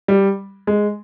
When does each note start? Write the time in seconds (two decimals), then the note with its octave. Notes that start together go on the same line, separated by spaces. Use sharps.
0.08 G3
0.67 G#3